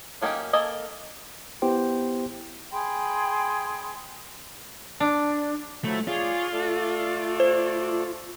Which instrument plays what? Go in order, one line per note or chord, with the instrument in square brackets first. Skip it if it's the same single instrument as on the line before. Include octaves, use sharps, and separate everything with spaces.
[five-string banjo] F#3 A#3 C#4 D#4 G4
A#3 A4 D#5 G#5
[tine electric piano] B3 E4 G4 C5 G5
[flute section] G#4 G5 B5 C6
[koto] D4
[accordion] F3 F#3 E4 [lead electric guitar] A3
[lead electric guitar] F4 [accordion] G#4 C#5 D5
[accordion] A3 A4 D5
[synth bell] C5